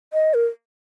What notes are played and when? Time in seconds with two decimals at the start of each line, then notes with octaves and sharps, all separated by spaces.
0.13 D#5
0.34 A#4